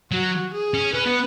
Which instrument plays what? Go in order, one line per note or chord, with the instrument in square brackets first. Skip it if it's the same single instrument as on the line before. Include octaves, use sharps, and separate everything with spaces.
[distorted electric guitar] F#3 [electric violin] F#4
[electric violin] G#4
[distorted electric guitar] C#4
[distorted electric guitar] C#4 [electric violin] B4
[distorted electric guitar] B3